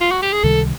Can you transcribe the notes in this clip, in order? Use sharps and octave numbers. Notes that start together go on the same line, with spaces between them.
F4
F#4
G4
G#4
C#2 C3 D#3 G3 A4